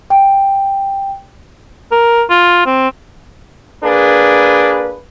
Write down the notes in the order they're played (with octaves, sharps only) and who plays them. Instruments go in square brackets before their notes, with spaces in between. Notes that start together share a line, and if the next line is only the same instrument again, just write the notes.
[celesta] G5
[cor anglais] A#4
F4
C4
[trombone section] A#3 D4 G#4 B4